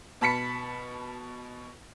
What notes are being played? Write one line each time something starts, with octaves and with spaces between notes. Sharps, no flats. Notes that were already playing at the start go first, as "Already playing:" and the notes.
B2 A5 B5 B6 C#7